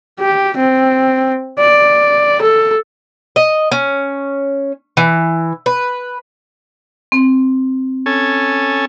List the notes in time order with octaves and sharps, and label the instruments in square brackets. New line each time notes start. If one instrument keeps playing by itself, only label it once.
[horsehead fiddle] G4
C4
D5
A4
[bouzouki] D#5
C#4
E3
B4
[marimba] C4
[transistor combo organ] C#4 A4 G#5